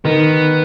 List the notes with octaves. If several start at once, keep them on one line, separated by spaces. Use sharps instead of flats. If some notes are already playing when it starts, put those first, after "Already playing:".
D#3 B3